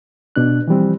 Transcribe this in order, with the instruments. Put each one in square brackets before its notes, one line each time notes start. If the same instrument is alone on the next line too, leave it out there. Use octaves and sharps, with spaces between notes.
[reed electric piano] B2 D4 F#6
E3 F3 G3 C4